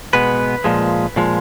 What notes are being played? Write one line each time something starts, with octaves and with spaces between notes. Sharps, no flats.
B2 G#3 B3 B4
A#2 F3 G#3
A#2 F3 G#3